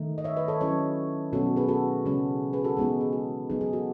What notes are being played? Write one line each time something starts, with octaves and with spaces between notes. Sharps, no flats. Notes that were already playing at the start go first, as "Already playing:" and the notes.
Already playing: D#3 A3 D#4
D#5
C#5 E5
B4 D#5
A4 C#5
F#3 C#4 E4 A4 C#5
B2 F#3 C#4 F#4 A4
G#4 B4
F#4 A4
C#3 G#3 C#4
G#4 B4
F#4 A4
E3 G#3 B3 D#4 G#4
G#4
F#4
F#3 B3 D#4 G#4
G#4
F#4 A4